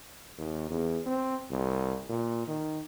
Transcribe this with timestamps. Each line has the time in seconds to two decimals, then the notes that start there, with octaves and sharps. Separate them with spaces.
0.38 D#2
0.71 E2
1.06 C4
1.51 C2
2.09 A#2
2.47 D#3